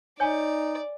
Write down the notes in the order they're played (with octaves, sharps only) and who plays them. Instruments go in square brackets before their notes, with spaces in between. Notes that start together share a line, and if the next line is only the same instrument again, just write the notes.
[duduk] D#4 [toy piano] C#5 G#5 [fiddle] D5